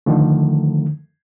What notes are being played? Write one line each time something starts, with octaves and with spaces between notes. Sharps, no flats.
D3 D#3 F3 A3